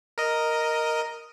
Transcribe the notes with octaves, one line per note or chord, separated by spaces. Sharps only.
A#4 D#5